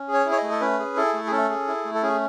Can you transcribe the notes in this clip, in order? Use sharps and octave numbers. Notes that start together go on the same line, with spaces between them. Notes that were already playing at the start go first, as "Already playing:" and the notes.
Already playing: C#4
G#4
C#5
E4
C#5
D#5
A3
A4
C#4 B4
G#4
E4 A4
A3
G#4
C#4 A4
G#4
E4
A3
A4
C#4 G#4